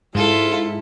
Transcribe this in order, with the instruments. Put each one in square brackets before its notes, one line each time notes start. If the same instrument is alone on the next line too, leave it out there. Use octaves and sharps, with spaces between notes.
[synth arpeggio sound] G#2 [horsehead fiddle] E4 [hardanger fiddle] F4 A4